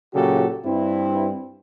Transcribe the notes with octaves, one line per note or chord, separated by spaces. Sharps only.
A#2 C#3 F#3 F#4 G4 A4
G2 C4 E4